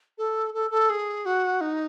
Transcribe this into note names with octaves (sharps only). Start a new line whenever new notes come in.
A4
A4
A4
G#4
F#4
D#4